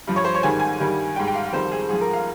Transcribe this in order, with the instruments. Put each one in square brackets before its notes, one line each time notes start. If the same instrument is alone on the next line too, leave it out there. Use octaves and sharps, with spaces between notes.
[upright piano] G2 F3
C#5
C5
C#5
G#2 D#3 G3 G#5
G#5
G2 D#3 G3
G3 G5
G#2
G5
F5
F2 D#3 G3 C5
G#4
G#2 F3 G#4
A#4
F5